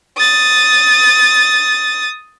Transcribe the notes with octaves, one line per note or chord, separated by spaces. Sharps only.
D#6 A6